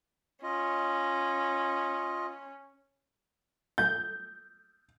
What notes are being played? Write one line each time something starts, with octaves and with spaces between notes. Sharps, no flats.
C#4 F4 D#5
G6